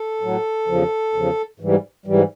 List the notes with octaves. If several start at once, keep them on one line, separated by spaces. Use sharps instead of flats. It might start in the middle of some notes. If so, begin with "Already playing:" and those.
Already playing: A4
A2 F#3
E2 C#3 F3
E2 C#3 F3
G#2 E3 G3
G#2 E3 G3